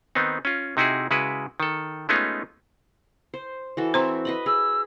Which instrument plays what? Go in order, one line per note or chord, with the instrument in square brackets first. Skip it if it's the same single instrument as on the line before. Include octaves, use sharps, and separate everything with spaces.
[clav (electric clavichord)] D#3 B3 C4 D#4
C#4 F4
C3 D#4 E4 F#4 G#4
C#3 G#3 E4 F#4 B4
D#3 A4
G#3 A3 B3 C#4 D#4 F4
[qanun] C5
E3 F#4 A4
[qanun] C4 E5 [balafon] C5 A#5 C6
[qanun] B4 D#5 B5
[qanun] G#4 [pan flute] E6